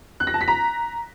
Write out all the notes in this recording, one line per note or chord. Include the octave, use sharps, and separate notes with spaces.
F#6
A#6
A5
B6
A#5